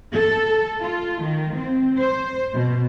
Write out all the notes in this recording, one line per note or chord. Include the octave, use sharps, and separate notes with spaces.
A4
F4
D#3
C4
C5
B2